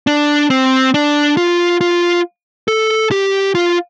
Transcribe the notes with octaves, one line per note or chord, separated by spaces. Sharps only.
D4
C4
D4
F4
F4
A4
G4
F4